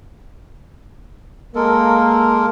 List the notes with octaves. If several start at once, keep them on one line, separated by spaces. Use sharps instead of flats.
G#3 A#3 A4 A#4